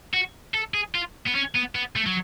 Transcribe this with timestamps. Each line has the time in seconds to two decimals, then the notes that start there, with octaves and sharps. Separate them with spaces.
0.14 F#4
0.54 A4
0.74 G#4
0.95 F4
1.26 B3
1.35 C#4
1.55 B3
1.75 B3
1.96 A3
2.06 F#3